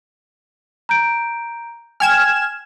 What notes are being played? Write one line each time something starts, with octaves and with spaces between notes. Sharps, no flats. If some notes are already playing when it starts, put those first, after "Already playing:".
A#5 G6 D7
G5 G#5 F6 G#6 E7